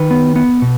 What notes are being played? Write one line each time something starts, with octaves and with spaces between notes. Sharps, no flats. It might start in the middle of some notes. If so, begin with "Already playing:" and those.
Already playing: D#3 B4
B3
B3
B2